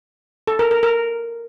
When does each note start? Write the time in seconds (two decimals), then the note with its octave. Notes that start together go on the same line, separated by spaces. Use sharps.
0.47 A4
0.59 A#4
0.71 A#4
0.83 A#4